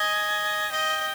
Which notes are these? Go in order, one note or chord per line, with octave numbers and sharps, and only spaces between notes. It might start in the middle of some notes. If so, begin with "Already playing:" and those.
Already playing: D#5 G#5
D#5 G5